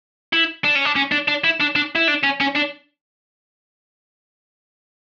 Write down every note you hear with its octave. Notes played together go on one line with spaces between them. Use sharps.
E4
D4
C#4
D4
C#4
D4
D4
E4
D4
D4
E4
D4
C#4
C#4
D4